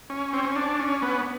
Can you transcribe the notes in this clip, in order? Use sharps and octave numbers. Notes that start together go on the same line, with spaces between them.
C#4
C4
C#4
D4
C#4
B3